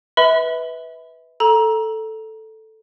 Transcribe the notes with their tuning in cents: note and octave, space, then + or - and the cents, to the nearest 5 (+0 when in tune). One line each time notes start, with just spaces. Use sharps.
B4 +0 E5 -30 B5 +30
A4 +0 A#5 +20